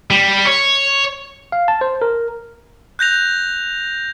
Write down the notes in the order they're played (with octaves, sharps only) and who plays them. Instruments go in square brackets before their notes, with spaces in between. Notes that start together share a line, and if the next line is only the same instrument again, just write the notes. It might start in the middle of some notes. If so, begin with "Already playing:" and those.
[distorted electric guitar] G3
C#5
[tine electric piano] F5
A5
C5
A#4
[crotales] F#6 G6 A#6 F7